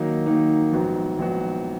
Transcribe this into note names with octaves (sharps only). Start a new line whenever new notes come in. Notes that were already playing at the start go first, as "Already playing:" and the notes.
Already playing: D#3 F#3 A#3 D#4
D#3 F#3 A#3 D#4
A#1 G#2 F#3 B3 F#4
A#1 G#2 F#3 B3 F#4